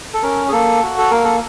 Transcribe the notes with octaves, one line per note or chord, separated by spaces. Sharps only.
A4
C#4 A#4
G#4
A#3 A4
F#4
A4
A#3 A#4
A4